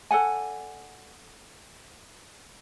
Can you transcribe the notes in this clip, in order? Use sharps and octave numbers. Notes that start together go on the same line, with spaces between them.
A4 D5 F#5 G#5